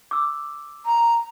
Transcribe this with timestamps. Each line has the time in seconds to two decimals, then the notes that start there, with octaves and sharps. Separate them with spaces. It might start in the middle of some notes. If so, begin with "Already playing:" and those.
0.11 D6 E6
0.85 A#5